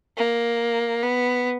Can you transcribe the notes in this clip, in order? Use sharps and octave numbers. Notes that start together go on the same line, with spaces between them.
A#3
B3